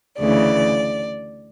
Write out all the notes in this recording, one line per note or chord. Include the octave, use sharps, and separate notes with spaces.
D2 C#3 E3 D5